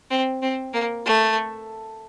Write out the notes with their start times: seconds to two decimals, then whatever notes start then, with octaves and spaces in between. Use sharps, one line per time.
0.11 C4
0.42 C4
0.73 A#3
1.06 A3